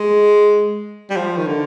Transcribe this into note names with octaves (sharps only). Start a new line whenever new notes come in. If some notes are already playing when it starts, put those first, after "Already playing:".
Already playing: G#3
G3
F3
D#3
D3